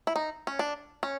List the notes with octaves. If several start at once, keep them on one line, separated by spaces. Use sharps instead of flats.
E4
D#4
C#4
D4
C#4